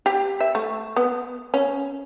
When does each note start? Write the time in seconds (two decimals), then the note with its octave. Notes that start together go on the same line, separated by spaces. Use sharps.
0.06 G4
0.40 E5
0.55 A3
0.96 B3
1.54 C#4